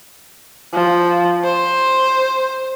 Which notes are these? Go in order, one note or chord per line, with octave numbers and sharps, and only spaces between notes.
F3
C5